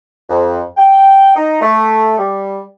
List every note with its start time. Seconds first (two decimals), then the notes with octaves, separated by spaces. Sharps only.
0.29 F2
0.77 G5
1.36 D#4
1.61 A3
2.18 G3